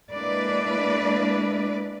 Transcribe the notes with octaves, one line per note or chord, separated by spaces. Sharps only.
G#3 A#3 D4 E4 B4 D5